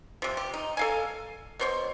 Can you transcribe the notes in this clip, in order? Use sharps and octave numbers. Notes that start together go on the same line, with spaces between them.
C3 F3
G4
D#4
A4 F5 G#5
B2 C5 C#5